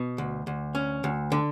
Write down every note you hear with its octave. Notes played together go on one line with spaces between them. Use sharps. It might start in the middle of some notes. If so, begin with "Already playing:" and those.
Already playing: B2
D2
D2
C#4
D2
D3